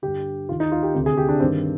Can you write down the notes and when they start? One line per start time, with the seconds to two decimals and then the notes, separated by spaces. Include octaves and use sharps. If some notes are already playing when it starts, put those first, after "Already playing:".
0.02 G2 D3 G4
0.49 D#2 D#3 F4
0.60 D#4
0.72 F4
0.83 G4
0.94 D2 C3 D#3
1.06 G#4
1.17 G4
1.29 D4
1.40 G2 D#3 C4